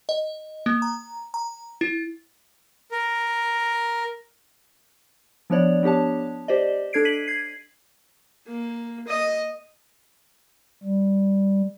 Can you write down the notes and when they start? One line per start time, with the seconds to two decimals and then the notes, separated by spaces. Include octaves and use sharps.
0.09 D#5
0.66 A#3
0.82 A#5
1.34 A#5
1.81 E4
2.92 A#4
5.50 F3 B3 D4 C#5 D5
5.83 B3 D4 G4 C#5 A5
6.48 G4 C5 D5 D#5
6.93 D4 A4 G#6 C7 D7
7.05 B6 D#7 F#7
7.28 G#6 C7
8.47 A#3
9.07 D#5
10.84 G3